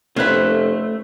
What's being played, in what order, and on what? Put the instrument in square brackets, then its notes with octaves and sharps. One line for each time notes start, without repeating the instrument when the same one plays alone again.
[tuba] F1 [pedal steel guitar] A3 [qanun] C#4 B4 [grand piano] C5 F#6 B6